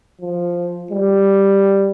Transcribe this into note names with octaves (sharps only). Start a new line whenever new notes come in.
F3
G3